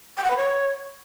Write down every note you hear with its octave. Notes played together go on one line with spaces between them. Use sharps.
G5
F#5
B4
C#5